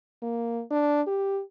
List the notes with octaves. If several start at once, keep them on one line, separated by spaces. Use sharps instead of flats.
A#3
D4
G4